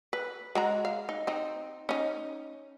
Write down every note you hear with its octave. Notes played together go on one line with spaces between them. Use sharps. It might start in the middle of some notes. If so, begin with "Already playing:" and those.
B4
G#3 F#4 A#5
F5
D#4
C4 D#4
C#4 D#4